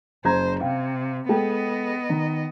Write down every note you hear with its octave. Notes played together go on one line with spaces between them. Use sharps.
F#1 C5 A#5 G#6
C3 F5 G5
G#3 B3 A4 D#5 G5
D#3